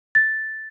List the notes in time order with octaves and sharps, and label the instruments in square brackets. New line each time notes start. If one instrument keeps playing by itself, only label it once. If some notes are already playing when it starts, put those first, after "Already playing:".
[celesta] A6